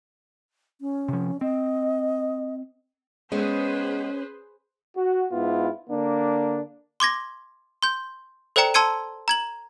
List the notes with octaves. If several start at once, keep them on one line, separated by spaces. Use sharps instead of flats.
C#4
C3 F3
C4 D#5
G#3 B3 C#4 G#4 B4 C5
F#4
G#2 B3 E4 F4
D3 A#3 D4
C6 D6 G#6 A#6
C6 G6
A4 C5 D5 G5 A#5 C#7
A5 C6 E6 G#6 C#7 D#7
A#5 G#6 F#7